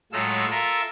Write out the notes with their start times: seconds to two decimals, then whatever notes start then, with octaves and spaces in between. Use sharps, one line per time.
0.12 A2 F#3 G#3 A3 F4 E6
0.51 F4 A4 A#4 E5